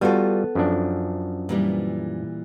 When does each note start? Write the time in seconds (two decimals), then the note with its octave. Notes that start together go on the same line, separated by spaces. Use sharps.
0.01 G3 B3 F4 F#4 A4
0.55 F#2 F3 D4
1.49 A#2 E3 G3